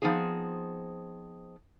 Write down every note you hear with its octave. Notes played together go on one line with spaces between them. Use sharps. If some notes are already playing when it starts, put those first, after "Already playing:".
F3 B3 C4 D#4 G#4